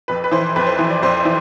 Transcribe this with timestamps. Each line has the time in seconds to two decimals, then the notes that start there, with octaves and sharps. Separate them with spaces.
0.08 F2 B4
0.24 B4
0.31 E3 C5
0.56 F2 B4
0.67 C5
0.79 E3
0.90 D5
1.03 F2 C5
1.25 E3